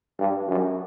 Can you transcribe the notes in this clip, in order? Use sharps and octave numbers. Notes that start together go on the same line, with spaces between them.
G2
F#2